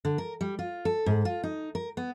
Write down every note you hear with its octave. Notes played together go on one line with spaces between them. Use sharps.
D3
A#4
G3
F4
A4
G#2
F4
D#4
A#4
B3